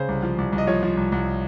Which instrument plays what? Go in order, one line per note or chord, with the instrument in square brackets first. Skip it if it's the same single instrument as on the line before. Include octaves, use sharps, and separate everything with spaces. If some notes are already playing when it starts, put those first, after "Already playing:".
Already playing: [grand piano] C#3 C5
C2
F3
C2
C2
D#5
F3 C#5
F3
C2
C2